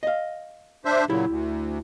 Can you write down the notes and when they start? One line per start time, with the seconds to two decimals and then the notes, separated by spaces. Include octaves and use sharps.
0.03 D#5 F5
0.85 D4 C5 E5
1.09 A#2 C#3 F#3 E4 G4
1.28 D2